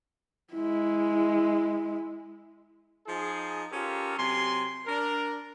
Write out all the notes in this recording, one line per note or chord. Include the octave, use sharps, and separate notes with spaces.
G#3 E4
F3 D#4 G#4
C#4 F4 G4 A4 A#4
C3 F#3 G#5 C6
D4 A#4